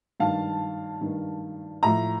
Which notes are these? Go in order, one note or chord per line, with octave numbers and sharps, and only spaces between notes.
G2 D#3 F5 A5
G2 D#3
A2 F3 A#5